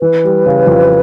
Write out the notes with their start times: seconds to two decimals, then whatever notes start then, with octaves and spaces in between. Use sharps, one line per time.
0.01 E3 B4
0.24 G3
0.46 C#3
0.67 F2